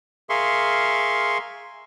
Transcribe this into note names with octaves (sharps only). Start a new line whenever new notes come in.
G#4 A#4 E5 F5 C6 C#6